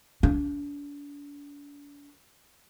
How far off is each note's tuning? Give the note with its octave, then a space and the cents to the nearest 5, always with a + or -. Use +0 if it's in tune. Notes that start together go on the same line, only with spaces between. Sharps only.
D4 -40